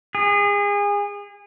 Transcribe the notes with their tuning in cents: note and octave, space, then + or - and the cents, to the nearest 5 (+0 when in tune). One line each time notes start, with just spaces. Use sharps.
G#4 -30